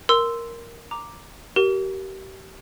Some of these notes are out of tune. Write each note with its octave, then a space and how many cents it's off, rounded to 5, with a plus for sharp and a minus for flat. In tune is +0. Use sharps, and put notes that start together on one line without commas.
A#4 +0 C6 -10 E6 +0
A#5 +0 D6 +0
G4 -35 A#4 +5